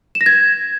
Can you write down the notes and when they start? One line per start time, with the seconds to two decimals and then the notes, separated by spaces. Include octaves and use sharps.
0.15 E7
0.21 A#6
0.26 G#6